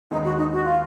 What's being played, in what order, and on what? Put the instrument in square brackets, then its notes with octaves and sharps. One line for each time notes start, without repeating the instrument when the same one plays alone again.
[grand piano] D#2 D#3 G#3 B3 [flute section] D#4
[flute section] F#4
D#4
F#4
F4